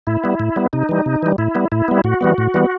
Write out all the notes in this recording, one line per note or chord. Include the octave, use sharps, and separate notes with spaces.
A2 E4
G3 B3
A2
G3 B3
C3 D#4
E3 G3
C3
E3 G3
A2 E4
G3 B3
A2 E4
G3 B3
A2 F#4
E3 G3 B3
A2
E3 G3 B3